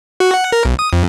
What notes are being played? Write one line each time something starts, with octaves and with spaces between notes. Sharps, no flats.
F#4
F#5
A#4
B1
D#6
F2